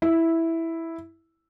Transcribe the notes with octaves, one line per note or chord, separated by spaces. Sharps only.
E4